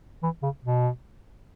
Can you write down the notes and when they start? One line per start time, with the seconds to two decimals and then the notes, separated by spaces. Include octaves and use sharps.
0.23 E3
0.43 C#3
0.64 B2